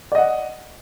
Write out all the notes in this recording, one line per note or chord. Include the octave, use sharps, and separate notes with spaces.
D5 D#5 F#5